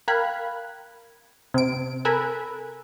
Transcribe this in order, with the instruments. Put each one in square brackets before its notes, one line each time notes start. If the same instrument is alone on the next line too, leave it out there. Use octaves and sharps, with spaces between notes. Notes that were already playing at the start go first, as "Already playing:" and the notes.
[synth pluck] A#4 F5 G5 B5 F#6 G#6
C3 D7
A4 A#4 G#5 B5 E6 F#6